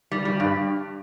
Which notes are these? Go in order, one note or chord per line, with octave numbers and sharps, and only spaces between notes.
G3
G3
G2